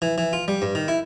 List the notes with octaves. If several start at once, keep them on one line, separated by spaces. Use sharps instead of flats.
E3
E3
F4
G3
G2
D#3
E4